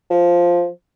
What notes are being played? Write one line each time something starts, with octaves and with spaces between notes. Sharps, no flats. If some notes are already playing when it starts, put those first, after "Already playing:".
F3